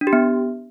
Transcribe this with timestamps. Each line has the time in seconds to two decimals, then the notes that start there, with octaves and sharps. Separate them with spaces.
0.01 D4
0.07 G4
0.13 B3